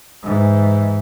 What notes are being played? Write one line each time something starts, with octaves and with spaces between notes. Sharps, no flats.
G#2 E3